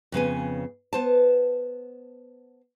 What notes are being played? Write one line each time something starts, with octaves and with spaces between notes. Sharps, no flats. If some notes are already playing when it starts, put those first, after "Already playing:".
F2 C#3 B3 G#5
B3 C5 A5